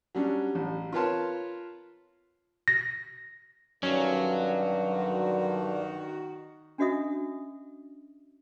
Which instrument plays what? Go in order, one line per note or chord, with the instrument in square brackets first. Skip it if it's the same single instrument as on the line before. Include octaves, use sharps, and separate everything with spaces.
[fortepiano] F#3 G3 C#4 D4
A1
F4 A#4 B4 C#5 A5 C6
[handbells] A#6
[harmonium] G2 D3 [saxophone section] D#3 F#4 [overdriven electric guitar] F#3 [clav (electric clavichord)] C#4
[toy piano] C#4 D4 F#4 D#5 E5 D#6